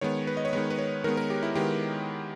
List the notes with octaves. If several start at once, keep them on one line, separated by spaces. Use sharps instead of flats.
D#3 G#3 B3 C#5
B4
D#5
C#5
D#3 G#3 B3 B4
B4
C#5
D#3 G#3 B3 A#4
A#4
G4
E4
D#3 G#3 B3 G4